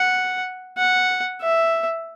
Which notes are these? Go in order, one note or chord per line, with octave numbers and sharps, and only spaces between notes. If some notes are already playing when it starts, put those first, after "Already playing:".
Already playing: F#5
F#5
E5